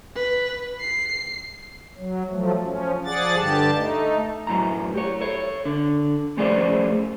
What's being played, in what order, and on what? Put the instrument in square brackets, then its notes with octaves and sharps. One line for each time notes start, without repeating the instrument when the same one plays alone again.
[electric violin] B4
C7
[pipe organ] F#3
F3 F#3 A3
F3 C#4
F3 G#4 D5 F#5 A6
G2 D3 G4 A5
A3 D#4
[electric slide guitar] F#2 A2 A#5
G4 C#5
A4 C#5
D3
F3 A3 C#4 G#4 C5 D5